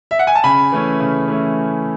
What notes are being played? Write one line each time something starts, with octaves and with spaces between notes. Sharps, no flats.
E5
F#5
G#5
A5
C#3 G#5 B5
E3 A3 C#4 E4
C#3
E3 A3 C#4 E4